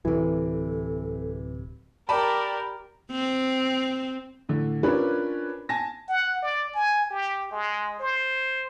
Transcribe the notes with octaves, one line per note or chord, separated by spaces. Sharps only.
D1 C3 E3 A4
G4 A#4 D5 A5 B5
C4
A2 D3
C#4 D4 F4 A#4 B4
G#5 A5 A#6
F#5
D5
G#5
G4
G#3
C5